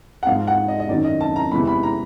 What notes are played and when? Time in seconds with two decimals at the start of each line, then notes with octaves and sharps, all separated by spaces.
0.23 F#5
0.27 G#2 F3 G#3 F5
0.47 F#5
0.68 D#5
0.80 D#5
0.89 F#2 D#3 F#3 D5
1.05 D#5
1.21 A5
1.36 A#5
1.51 E2 C3 E3 G#3 B5
1.67 B5
1.83 A#5